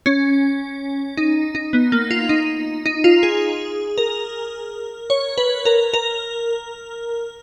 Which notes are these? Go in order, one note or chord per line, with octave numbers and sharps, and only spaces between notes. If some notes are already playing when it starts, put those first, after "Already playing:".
C#4
D#4
D#4
B3
A#3
F4
D#4
D#4
F4
G#4
A#4
C#5
B4
A#4
A#4